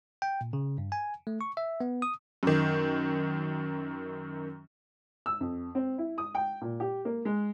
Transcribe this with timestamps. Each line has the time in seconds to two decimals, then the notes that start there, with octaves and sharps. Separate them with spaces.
0.22 G5
0.41 A#2
0.53 C#3
0.78 G2
0.92 G#5
1.27 A3
1.41 C#6
1.57 E5
1.81 B3
2.02 D#6
2.43 F#2 D#3
5.26 E6
5.41 F2
5.75 C4
5.98 E4
6.18 D#6
6.35 G5
6.61 A#2
6.80 G4
7.05 A#3
7.25 G#3